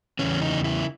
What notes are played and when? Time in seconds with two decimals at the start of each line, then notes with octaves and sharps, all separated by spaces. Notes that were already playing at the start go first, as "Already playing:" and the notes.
0.19 E2 C#3 E3 C#4
0.42 D#4
0.64 E4